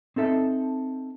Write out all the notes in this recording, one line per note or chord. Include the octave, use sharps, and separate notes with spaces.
C4 D#4 A4 E5